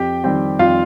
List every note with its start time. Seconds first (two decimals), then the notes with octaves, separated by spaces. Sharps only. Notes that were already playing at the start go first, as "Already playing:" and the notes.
Already playing: F2 G4 G5
0.24 D#3 G3 C4 G4 G5
0.59 F2 F4 F5